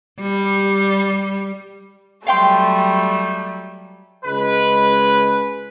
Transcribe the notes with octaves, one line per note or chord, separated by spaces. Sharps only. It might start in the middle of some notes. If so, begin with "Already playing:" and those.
G3
F#3 G3 A3 F5 G5 C6
C#2 G#3 B4